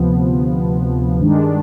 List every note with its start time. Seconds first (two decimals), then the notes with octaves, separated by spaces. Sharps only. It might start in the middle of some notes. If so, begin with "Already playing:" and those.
Already playing: D2 C3 F3 B3
1.20 G2 D#3 G#3 D4